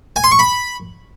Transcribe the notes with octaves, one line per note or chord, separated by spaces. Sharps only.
G#5
C6
C#6
B5